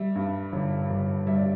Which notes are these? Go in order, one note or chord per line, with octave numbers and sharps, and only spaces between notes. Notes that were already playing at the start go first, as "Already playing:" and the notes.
Already playing: G3 E5
G2
G1
G1
G3 E5
D5